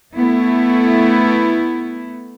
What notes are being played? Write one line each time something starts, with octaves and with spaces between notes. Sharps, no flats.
A3 B3 E4